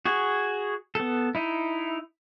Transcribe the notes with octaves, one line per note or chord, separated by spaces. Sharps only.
F#4 G#4
B3 A4
D#4 E4